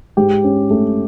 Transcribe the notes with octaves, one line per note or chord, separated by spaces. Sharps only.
G#2 G4
C#4
A3